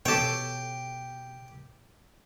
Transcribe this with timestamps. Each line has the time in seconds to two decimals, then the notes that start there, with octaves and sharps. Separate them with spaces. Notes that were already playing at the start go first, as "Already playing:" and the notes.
0.05 B2 G4 A4 C#5 G5